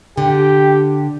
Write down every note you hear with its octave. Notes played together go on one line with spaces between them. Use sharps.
D3 G4